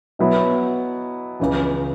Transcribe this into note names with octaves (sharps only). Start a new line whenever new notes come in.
B2 F#3 B3 E4
C#2 C#3 E3